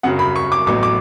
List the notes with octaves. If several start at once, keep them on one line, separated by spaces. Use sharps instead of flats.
F#2 C#3 F#3 F#5
B5
C#6
D6
A1 A2 F#3 B3 D6
D6